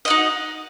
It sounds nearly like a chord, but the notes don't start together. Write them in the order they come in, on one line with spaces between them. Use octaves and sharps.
D#5 F#4 D#4